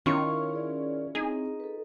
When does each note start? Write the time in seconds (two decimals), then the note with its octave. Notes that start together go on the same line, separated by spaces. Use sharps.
0.06 D#3 C#4 E4 F4 C#6
0.54 G#4 D5
1.15 C4 D#4 G#4
1.60 A4 B4